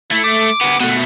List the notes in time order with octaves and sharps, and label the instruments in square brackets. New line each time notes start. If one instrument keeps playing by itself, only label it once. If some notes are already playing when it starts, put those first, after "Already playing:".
[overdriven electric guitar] A3 [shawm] E4
[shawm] D6
[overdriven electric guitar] D2 B3
[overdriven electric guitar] B2 A3 [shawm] F#5